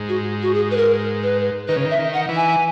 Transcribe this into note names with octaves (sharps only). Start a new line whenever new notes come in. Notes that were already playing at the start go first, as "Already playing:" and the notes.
Already playing: G#2
F#4
F#4
G#4
B4
A#4
B4
D#3 B4
C#3
D#3
E5
D#3
F#5
E3
G#5